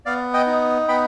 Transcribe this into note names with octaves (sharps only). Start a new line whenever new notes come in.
B3 D5 F5
D#5 G5
D#4
B3 G5 B5